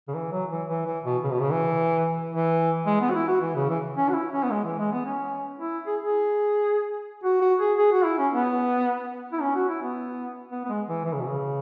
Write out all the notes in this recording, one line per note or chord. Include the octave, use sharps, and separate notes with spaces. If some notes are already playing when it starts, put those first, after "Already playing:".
C#3
E3
F#3
E3
E3
E3
B2
C#3
B2
C#3
E3
E3
G#3
B3
F#4
E4
F#4
E3
C#3
E3
C#4
F#4
E4
C#4
B3
G#3
E3
G#3
B3
C#4
E4
G#4
G#4
F#4
F#4
G#4
G#4
F#4
E4
C#4
B3
E4
C#4
F#4
E4
B3
B3
B3
G#3
E3
E3
C#3
B2
C#3